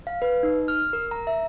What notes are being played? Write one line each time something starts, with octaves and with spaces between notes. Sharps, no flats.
F5
B4
D#4
F6
A#4
A#5
E5